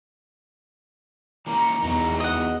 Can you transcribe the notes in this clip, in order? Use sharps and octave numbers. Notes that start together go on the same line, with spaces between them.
E3 A#3 C#4 A#5
E2 E3 F#3 D#4
D#5 F#5